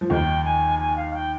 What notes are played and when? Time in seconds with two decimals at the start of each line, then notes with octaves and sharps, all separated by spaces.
0.01 F3
0.10 D#2 D#3 G5
0.45 G#5
0.79 G#5
0.96 F5
1.14 G5